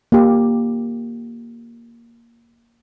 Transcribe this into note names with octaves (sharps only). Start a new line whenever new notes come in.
A#3 G4